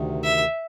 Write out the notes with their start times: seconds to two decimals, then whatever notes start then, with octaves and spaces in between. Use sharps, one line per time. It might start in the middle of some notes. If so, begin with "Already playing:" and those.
Already playing: D2 C3 D#3
0.24 E5